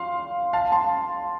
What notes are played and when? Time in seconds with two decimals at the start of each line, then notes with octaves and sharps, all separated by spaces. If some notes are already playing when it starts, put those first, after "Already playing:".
Already playing: F5 C6
0.53 F5 A5
0.72 A5 C6